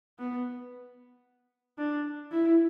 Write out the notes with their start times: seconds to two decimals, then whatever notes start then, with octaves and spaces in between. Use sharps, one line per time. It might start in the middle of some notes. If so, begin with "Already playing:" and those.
0.19 B3
1.78 D4
2.31 E4